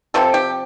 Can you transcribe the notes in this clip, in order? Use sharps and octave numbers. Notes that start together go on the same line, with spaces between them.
C3 F3 C4 A4
G4